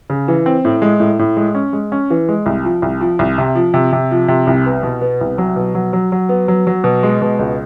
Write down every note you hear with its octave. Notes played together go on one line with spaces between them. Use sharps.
C#3
E3
C4
A2
G#3
A2
A2
G#3
C#4
G#3
C#4
E3
G#3
C2
F3
C2
F3
C2
C3
F3
C3
C3
F3
C3
C2
B3
B2
B3
C2
F#3
B2
F#3
F#3
F#3
B3
F#3
F#3
B2
G#3
B2
C#2